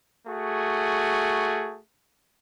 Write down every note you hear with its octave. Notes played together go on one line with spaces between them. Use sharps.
A3 F#4 G#4